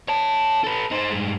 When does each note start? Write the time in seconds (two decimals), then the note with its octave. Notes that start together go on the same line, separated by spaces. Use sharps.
0.08 C#5 A5
0.64 A4 B4
0.91 D#4 C5
1.11 G2 G#3